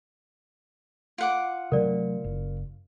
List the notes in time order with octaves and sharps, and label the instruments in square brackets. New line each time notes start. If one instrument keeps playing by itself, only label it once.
[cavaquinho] F4 F#5 D6
[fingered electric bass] C3 F#3 A3 [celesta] A#4 D5
[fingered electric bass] F#1